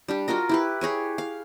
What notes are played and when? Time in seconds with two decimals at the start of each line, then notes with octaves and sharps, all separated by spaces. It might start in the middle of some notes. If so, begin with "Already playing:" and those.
0.08 G3 D4 G4
0.28 F4 F#4 A#4 D#5
0.49 E4 G4 B4
0.81 G4 G#4 C#5 G#5
1.18 F5